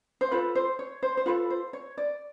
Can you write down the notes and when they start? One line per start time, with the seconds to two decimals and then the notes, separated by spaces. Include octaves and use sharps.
0.21 C5
0.31 F4 A4 B4
0.55 C5
0.79 C#5
1.03 C5
1.17 C5
1.26 F4 A4 B4
1.50 C5
1.73 C#5
1.98 D5